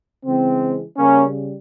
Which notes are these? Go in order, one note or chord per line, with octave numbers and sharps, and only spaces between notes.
C#3 E3 G#3 C4
C#3 G3 A#3 C#4